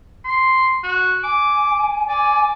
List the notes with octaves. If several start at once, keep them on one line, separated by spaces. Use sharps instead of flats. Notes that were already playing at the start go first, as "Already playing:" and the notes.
C6
F#4
G#5 D6
D5 G#5